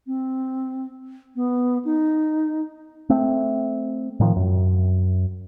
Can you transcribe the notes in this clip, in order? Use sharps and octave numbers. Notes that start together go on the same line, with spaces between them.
C4
B3
D#4
A3 C4
A2 D#3 F3
F#2